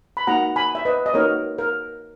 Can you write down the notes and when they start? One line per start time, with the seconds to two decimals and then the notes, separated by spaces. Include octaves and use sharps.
0.17 B5
0.27 A#3 D#4 F#4 F#5 A#5
0.56 G#5 B5
0.75 E5
0.85 B4 D#5
1.06 D#5
1.14 A#3 D#4 F#4 A#4 C#5
1.58 A#4